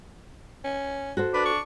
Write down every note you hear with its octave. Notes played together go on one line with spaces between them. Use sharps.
C#4
F#4 A4 C5
D4 B4
C#6